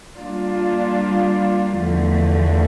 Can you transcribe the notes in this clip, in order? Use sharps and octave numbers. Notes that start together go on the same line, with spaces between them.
G3 A#3 D4 F4
E2 D3 F3 A3